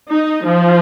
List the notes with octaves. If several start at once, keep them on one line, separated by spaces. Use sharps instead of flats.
D#4
F3